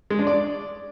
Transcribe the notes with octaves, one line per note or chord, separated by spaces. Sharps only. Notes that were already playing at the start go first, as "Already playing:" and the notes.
G#3
D4
D5